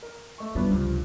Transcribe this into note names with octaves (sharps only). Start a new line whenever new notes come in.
A#4
A3 C#6
E2 G3 B3 D4 F4
C#2 G2 C3 F3